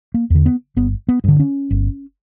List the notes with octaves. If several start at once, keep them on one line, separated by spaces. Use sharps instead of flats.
A#3
E2 D3
B3
G1 B3
B3
G2 D3
C#4
G1